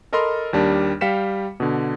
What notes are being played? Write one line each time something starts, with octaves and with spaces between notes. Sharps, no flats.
A4 A#4 D#5 B5 C6 F6
D#2 G3 D4 A#4
G3 F5 G5 B6 C#7 E7
B2 D3